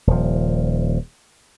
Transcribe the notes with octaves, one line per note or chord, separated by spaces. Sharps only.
D#1 F3